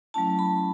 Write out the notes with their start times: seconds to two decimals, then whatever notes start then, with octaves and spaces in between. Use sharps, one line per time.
0.14 F#3 A3 C#4 E4 A5
0.39 B5